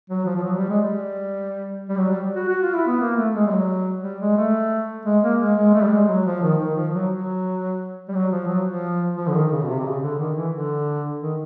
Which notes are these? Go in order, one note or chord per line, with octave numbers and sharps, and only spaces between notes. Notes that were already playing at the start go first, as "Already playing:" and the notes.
F#3
F3
F3
F#3
G3
G#3
G3
G3
F#3
G3
F#4
F#4
F4
E4
B3
A#3
A3
G#3
G3
F#3
G3
G#3
A3
G#3
A#3
G#3
G#3
A3
G3
G#3
F#3
F3
D#3
D#3
F3
F#3
F#3
G3
F#3
F3
F#3
F3
F3
D3
D#3
C#3
B2
C3
C3
C#3
D3
D#3
E3
D3
D#3